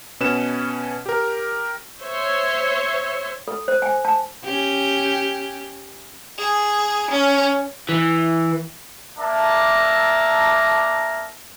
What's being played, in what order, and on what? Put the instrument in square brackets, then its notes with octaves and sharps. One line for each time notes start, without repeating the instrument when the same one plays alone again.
[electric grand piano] B2 C#4 B4 E7
G4 A#4
[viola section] C5 C#5 E5
[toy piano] A4
C5
G#5
A5
[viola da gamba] C#4 G4
[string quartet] G#4
C#4
[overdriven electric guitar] E3
[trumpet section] A#3 D4 E5 A5 A#5